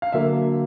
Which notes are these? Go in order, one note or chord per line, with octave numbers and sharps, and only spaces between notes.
F5
D3 F#3 A#3 E5